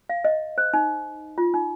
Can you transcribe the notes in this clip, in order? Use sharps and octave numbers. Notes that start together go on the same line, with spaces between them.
F5
D#5
C5
D#4
F4
D#4